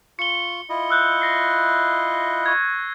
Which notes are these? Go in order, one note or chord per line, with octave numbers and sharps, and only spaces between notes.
F4 C#6 C#7 G7
E4 F4 D#5
E6 F#6 G6
A#6 C7
C#6 G#6